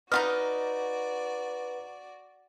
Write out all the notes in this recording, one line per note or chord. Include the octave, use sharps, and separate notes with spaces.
D#4 F4 F#4 B4 D5 D#5 F6